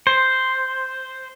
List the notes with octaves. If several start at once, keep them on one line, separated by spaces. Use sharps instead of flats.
C5